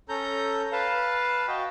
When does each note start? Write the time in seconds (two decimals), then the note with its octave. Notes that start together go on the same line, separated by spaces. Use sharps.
0.09 C#4 A4 A#5 G6
0.72 B4 F5 A5
1.48 F#4 D#5 G5